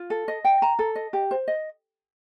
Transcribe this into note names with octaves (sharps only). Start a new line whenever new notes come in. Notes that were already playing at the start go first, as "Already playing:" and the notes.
Already playing: F4
A4
D#5
G5
A#5
A4
D#5
G4
C5
D#5